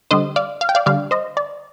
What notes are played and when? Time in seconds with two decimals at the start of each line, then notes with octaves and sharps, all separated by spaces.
0.11 D3 G3 C5 D#5
0.36 D5 F5
0.61 F5
0.69 G5
0.75 D5 F5
0.86 D3 G3 D5 F5
1.11 C5 D#5
1.37 D5